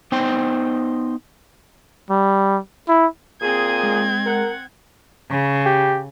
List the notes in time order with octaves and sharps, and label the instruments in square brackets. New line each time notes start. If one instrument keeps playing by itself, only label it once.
[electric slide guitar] B3 D#4 C5 G5
[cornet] G3
E4
[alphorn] A#2 [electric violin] C4 G#6 [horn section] G#4
[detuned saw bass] G#3
[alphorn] A#4 [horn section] F#5
[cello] C#3
[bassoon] G4